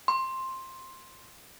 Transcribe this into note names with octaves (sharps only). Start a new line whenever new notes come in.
C6